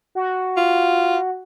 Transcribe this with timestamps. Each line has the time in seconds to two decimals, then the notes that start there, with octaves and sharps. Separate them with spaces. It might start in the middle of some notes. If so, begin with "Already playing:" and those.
0.15 F#4
0.57 F4